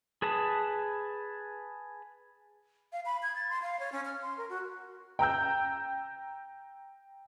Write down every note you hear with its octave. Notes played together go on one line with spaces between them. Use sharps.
G#4 B4 A5 D#6
F5
B5
G#6
A6
C6
F5
C#5
C#4
F6
C6
A#4
F#4
G5 A#5 E6 G6